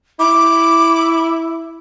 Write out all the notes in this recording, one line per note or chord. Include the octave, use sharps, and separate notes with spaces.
E4 D6